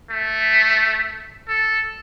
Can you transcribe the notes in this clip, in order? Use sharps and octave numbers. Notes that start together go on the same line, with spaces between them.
A3
A4